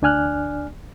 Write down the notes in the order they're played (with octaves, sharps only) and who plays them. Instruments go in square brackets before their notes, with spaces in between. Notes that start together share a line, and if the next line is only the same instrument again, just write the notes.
[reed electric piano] D2 D4 D5 G#5 F6 F#6